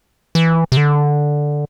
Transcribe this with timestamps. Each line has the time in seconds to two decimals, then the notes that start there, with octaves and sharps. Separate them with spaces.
0.35 E3
0.72 C3
0.77 D3